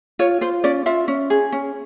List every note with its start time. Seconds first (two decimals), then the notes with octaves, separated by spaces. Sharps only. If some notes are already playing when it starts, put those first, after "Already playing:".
0.19 F4 C#5
0.41 F4 C5
0.64 C#4 D5
0.86 F4 E5
1.08 C#4
1.30 G#4
1.52 C#4